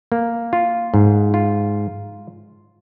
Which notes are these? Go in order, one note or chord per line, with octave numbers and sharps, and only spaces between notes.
A#3
F4
G#2
F4